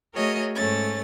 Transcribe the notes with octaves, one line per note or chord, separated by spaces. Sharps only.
A3 F#4 G#4 A#4 C#5 D#5
G#2 A3 C#4 A6